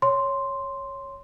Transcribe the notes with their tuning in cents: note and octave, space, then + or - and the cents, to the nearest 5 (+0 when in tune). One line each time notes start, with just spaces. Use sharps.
C#5 +0 C6 +0